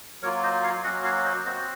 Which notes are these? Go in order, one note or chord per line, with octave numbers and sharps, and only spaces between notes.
F#3 A#3 F4 A#4 C#5
C5 D#5
C#5 F5
F#3 A#3 C#4 F#4 D#5 F#5
C#5 F5
C5 D#5
C4 F#4 C5 D#5